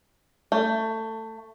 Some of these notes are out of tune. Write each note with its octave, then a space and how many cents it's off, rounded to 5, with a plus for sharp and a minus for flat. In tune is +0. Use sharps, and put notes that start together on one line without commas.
A3 +20